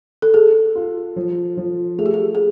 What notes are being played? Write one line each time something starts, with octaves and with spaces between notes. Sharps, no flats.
A4
G#4 A4
F4
F3
F3
A3 G#4
G4
G#4
G#4